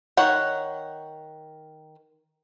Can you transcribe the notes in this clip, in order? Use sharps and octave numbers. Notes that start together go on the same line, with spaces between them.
D#3 C#5 F#5